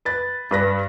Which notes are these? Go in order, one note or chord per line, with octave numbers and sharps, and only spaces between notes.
B4 A6
G2 B4 A#6